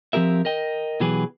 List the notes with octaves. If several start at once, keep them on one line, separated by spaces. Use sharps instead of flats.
F3 C4 G4 A#4 E5
A#4 D#5 G5
B2 E3 F#3 G4 G#4 B4